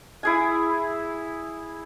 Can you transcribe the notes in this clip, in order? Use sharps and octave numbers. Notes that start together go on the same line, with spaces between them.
E4 G#4 G#5